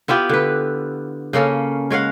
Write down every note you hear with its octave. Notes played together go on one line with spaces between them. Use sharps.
B3 E4 F4 G4
D3 B4
C#3 A#3 C#4 A4
G#3 C#5 F5 F#5